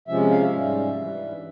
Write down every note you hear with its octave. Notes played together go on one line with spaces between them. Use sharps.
C3 F3 G#3 C#4 E5
F5
E5
G#2 G3 C#4
G2 E3 G3